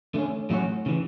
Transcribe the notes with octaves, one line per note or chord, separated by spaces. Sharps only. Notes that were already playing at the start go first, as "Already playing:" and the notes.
D3 A3 C#4
A2 F#3 A3 C#4 F#4
C#3 E3